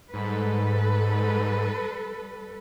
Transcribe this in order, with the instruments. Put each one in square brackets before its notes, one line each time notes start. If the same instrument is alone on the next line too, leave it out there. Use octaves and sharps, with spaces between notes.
[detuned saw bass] G#2 [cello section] G3 A4 B4